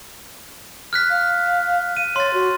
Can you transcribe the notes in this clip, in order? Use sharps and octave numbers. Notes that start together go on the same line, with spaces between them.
F6 F#6 B6
F5
D#7
C#5 C6 A6
F#4